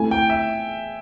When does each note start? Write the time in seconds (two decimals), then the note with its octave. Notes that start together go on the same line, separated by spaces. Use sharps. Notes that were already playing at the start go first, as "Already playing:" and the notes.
Already playing: A3 C4 E4 A4 G#5
0.11 G5
0.30 E5